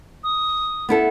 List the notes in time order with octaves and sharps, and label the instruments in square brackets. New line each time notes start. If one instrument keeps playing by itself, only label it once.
[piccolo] D#6
[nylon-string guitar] B3 E4 A4